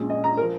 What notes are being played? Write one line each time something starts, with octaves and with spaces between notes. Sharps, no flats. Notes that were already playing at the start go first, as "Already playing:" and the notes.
Already playing: A#1 A#2 G#3 C#4
D#5
A#5
A#4
F3